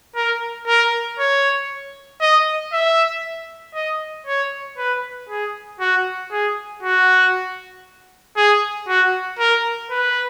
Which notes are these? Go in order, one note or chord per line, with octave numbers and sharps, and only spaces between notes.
A#4
A#4
C#5
D#5
E5
D#5
C#5
B4
G#4
F#4
G#4
F#4
G#4
F#4
A#4
B4